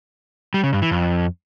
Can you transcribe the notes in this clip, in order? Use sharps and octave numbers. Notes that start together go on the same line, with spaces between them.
G3
C#3
G2
E3
F2